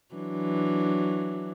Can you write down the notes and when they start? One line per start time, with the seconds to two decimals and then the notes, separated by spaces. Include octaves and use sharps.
0.15 E3 F#3 D4